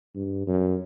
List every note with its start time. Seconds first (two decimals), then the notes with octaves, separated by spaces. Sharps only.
0.15 G2
0.47 F#2